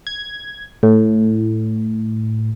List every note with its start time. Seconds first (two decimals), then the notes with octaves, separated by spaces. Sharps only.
0.07 G#6
0.83 A2